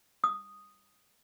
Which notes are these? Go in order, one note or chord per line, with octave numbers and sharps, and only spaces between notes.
D#6